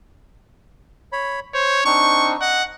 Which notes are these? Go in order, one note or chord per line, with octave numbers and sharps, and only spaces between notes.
C#5 B5
C5 C#5
C4 D4 D#4 C#6
D#5 F#5